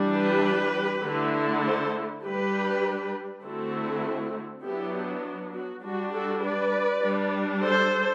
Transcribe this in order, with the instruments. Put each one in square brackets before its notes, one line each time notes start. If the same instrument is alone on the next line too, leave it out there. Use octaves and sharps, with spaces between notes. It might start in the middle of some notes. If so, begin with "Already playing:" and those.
Already playing: [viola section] E3 G3 D4
G4 B4
D3 A3 E4
A4 C5
G3 D4 G4 B4
D3 A3 C4 E4 F#4 A4
F#3 B3 D4 E4 G4
F#4
G3 D4 F#4
F#4 A4
B4 D5
G3 D4
A4 C5